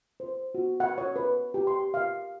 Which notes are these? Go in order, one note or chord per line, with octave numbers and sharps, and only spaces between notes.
C5
F#4
F#5
C#5
B4
G4
C6
F5